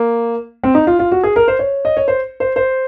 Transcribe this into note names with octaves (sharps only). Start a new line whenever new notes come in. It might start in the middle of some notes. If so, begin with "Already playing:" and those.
Already playing: A#3
C4
D#4
F4
F4
F#4
G#4
A#4
C5
C#5
D#5
C#5
C5
C5
C5